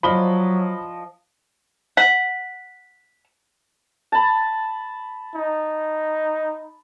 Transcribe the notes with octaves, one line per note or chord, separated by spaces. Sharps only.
F3 F#3 D#5 B5 G7
F#5 B6
A5 B5
D#4